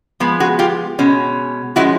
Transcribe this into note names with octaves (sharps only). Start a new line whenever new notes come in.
F3 G#3 B3
F#4 G#4
F4 G4
B2 G#3 C#4
F3 G#3 C#4 E4 F#4